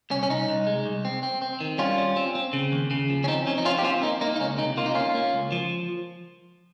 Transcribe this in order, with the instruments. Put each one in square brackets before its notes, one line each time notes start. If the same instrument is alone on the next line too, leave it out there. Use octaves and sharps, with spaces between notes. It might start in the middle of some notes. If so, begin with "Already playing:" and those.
[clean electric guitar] C2 C#4
C#4
C2 D#4
C2
G#3
C2
C4
C4
C4
D#3
G3 C#4 F4
G3
C4
C4
C#3
D#2
C#3
F3
C#4
C4 D#4
F3 C#4
D#4
C4 C#4 F4
G4
C4 C#4 F4
A#3 D#4
A#3 D#4
D#4
C#2 C#4
C3 D#4
A#3 F4
D#4
A#3 C#4 F4
A#3
C#2
F3